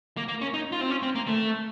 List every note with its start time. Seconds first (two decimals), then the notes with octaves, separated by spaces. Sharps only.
0.17 A#3
0.28 A#3
0.41 C#4
0.54 D#4
0.72 F4
0.81 C4
0.90 C#4
1.03 C4
1.15 A#3
1.27 A3